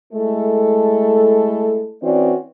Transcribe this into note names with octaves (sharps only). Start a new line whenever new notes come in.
G#3 A3 E4 A4
E3 C4 C#4 F#4 D5